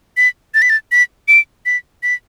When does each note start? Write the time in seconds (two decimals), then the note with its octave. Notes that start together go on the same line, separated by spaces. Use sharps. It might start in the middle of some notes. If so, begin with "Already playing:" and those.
0.17 B6
0.54 A6
0.62 B6
0.70 A6
0.92 B6
1.28 D7
1.66 B6
2.03 B6